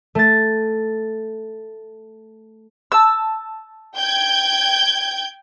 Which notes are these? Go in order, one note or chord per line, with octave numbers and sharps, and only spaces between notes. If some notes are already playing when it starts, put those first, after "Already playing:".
A3 A6
A5 E6
G5 G6 G#6